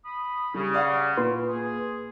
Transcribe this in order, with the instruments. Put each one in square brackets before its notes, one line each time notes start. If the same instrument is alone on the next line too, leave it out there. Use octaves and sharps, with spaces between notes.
[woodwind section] B5 D#6
[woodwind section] C#3 [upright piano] G3
[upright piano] D5 F5 F#5
[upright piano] A#2 [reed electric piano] B4 C6
[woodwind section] G#4